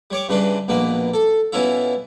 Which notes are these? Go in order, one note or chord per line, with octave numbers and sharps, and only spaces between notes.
G3 C#5 D6
G2 C#3 E3 D4 B4 C6
A#1 B2 A#3 B4
A4
B2 E3 C#4 E4 F4 E5